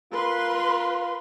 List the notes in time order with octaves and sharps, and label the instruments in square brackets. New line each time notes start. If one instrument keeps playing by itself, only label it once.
[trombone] F4 [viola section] A#4 B4 C6